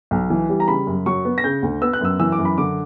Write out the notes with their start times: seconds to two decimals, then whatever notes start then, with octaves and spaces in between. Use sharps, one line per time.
0.11 B1
0.30 E3
0.49 G3
0.60 A#5
0.68 C#3 B5
0.87 F#2
1.06 F#3 C#6
1.25 B3
1.38 A#6
1.44 C#3 G6
1.63 D2
1.82 B3 E6
1.93 F#6
2.01 F#2 E6
2.19 E3 E6
2.32 D6
2.39 F#2
2.45 B5
2.58 D3 D6